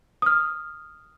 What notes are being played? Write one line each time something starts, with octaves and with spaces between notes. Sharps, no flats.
D#6 F6